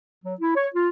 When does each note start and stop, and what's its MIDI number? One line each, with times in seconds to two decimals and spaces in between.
0.25 0.34 54
0.41 0.54 64
0.56 0.67 73
0.75 0.89 65